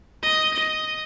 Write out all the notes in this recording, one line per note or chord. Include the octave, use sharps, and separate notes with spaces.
D#5
D#5